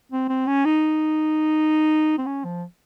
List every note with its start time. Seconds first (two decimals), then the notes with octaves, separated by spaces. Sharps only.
0.12 C4
0.29 C4
0.47 C#4
0.65 D#4
2.18 C4
2.26 C#4
2.44 F3